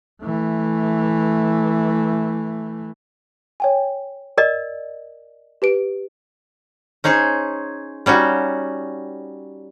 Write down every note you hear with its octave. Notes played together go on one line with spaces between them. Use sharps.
E3 A3
C#5 G5 G#5
A#4 D5 D#5
G4 B4 D7
C#4 D#4 G#4 C5 C#5
G3 C#4 D#4 F#4